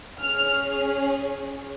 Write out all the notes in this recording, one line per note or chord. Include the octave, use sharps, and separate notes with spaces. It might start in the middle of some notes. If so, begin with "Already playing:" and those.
C#4 G#4 F6